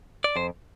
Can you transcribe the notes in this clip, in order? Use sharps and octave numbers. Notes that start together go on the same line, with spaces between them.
D5
F2 C5